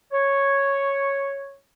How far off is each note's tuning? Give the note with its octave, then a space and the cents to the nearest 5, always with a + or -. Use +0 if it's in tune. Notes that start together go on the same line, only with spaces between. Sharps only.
C#5 -5